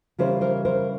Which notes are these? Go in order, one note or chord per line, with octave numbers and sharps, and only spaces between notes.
C#3 E3 G3 A#4 C5
A#4 C5
A#4 C5